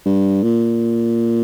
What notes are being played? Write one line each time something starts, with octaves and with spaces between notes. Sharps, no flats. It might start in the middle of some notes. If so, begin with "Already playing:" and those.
G2
A#2